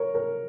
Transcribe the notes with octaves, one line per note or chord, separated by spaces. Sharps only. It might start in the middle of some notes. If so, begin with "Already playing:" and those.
Already playing: A#4 C#5
A#4